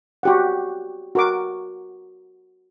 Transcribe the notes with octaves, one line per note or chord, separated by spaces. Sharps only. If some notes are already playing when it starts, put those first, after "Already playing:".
F#4 G4 F#5
F#4 A#4 D6